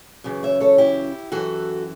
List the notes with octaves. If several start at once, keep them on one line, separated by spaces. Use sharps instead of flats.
F#2 C#3 E3
C#5 E5
A4 C#5
E4 G4
F#2 E3 F#4 A4